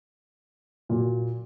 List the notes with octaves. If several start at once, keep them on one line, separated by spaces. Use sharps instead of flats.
A#2 F#3 A#3